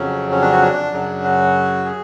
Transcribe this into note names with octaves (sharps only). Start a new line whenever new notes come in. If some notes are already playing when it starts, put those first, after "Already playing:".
Already playing: F2 C#3 F#3 C#4
C#4
D4
F#4
D4
F#2 C#3 F#3
F#4
G#4